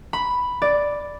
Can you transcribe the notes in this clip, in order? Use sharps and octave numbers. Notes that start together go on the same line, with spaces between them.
B5
D5